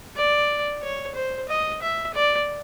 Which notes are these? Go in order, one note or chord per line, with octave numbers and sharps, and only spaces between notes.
D5
C#5
C5
D#5
E5
D5